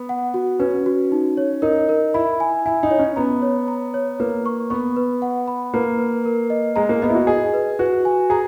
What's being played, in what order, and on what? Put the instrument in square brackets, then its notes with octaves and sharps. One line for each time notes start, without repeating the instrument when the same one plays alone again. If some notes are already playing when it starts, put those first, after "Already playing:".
Already playing: [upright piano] B3
[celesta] F#5
F#4
[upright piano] C#4 [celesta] B4
[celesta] F#4
D#4
C#5
[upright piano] D#4 [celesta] A#4
[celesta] A#4
[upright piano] E4 [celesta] B5
[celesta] G#5
[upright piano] E4 [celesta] G#5
[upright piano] D#4
[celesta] C#5
[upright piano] C#4
[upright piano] B3 [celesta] A#5
[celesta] C#5
A#5
C#5
[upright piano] A#3 [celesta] B4
[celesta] C#6
[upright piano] B3 [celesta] C#6
[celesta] B4
F#5
B5
[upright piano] A#3 [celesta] B4
[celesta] B4
A#4
D#5
[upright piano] G#3 [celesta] A#5
[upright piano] A#3
[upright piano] B3 [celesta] D#5
[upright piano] E4
F#4
[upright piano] G#4 [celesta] D#5
[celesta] B4
[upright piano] F#4 [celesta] B4
[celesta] G#5
[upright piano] G#4 [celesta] A#5